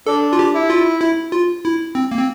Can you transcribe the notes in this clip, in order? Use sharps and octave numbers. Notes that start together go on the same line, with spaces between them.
D4 A4
F4
G4
E4
F4
E4
F4
E4
C4
A#3
C4